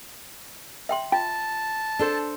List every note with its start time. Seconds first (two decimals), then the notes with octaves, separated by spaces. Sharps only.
0.89 E5 G5 C6
1.12 F4 G5 A5
1.99 D4 A4 C5